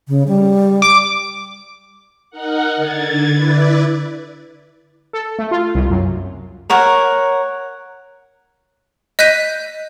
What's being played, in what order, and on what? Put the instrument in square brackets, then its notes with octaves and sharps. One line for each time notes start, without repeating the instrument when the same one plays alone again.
[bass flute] C#3
G3
[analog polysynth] D6
[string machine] D#4 A#4 F#5
D3 G#6 A6
E4 B4 D5
[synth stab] A4
A3
F4
C2
F#2
[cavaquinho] A#4 C#5 F#5
[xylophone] D#5 F#6 G6 B6 D#7